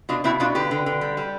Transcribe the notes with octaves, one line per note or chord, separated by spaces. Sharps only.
B2 D4 F4
B2 C4 E4
B2 D4 F4
D3 G4 B4
D3
D3
G3
G3